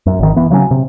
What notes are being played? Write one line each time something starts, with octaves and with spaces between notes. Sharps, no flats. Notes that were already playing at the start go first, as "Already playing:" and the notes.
F#2
G#1 D#3
E3 B3
C#3 F#3 B3 C#4
C3